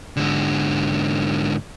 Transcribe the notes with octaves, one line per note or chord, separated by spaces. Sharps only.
G#2 D3